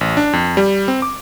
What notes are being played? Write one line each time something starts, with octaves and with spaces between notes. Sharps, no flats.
A1
D4
F2
G3
C4
D6